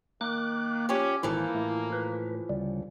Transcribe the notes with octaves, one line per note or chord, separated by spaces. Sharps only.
D#3 A#3 D6 F#6
F3 C#4 G4 C#5
G#1 E3 F3 A#3 E4 A4
A2
B4
D2 C#3 G3